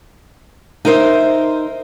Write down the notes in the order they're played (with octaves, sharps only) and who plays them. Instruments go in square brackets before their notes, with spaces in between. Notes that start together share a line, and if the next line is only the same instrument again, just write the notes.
[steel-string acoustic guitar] D#4 A#4 C5 E5